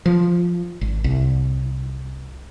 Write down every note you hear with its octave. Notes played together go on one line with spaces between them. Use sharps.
F3
G#1
C2